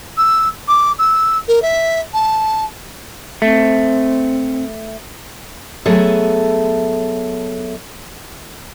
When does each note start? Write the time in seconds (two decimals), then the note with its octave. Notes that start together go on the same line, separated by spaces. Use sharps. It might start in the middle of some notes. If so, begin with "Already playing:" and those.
0.17 E6
0.68 D6
0.99 E6
1.48 A#4
1.62 E5
2.14 A5
3.42 A3 C4
5.85 F#3 A3 B3 G#4 A4 E5